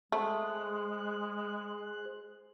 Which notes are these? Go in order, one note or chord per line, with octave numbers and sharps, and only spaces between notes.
G#3 A3 G#4 C5 F#6